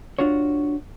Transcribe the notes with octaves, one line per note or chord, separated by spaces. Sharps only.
D4 F4 F#4 C#5